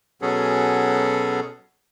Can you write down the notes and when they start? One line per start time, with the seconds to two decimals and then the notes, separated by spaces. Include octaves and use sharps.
0.22 B2 F#3 B3 C#4 G#4 A4